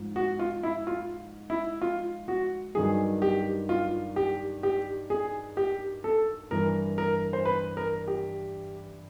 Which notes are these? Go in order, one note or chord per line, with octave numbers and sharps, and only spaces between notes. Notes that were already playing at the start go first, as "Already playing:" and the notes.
Already playing: G#2 F3
F#4
F4
E4
F4
E4
F4
F#4
G2 D#3 F#3 G#4
G4
F4
G4
G4
G#4
G4
A4
G2 E3 A#4
A#4
C5
B4
A#4
G4